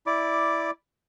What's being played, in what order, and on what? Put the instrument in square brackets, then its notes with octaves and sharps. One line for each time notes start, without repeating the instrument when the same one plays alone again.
[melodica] E4 D5 D6